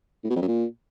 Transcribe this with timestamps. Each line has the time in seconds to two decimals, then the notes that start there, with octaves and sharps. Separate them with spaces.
0.24 A2
0.30 B2
0.36 F2
0.42 F#2
0.48 A#2